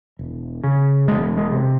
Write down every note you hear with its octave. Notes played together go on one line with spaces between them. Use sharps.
E1
C#3
E1 G#3
G#3
C3